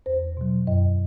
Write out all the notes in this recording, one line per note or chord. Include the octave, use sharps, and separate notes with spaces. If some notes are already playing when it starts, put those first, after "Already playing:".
E2 C5
B2 F#3
F#2 D#5